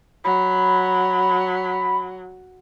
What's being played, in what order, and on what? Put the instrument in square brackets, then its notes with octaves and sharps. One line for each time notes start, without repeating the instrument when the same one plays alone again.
[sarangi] F#3 [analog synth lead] B5